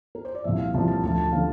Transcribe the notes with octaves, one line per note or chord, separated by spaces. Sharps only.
A#4
C5
D5
C2 A#2 F3 E5
F5
C2 A#2 F3 A5
A5
D2 D3 F3 A5
A5
D3 F3 F5